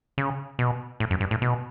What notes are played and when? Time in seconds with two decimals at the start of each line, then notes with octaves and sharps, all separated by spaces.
0.18 C#3
0.59 B2
1.00 A2
1.11 F#2
1.21 G2
1.31 A2
1.42 B2